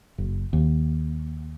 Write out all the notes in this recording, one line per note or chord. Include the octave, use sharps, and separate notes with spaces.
F#1
D#2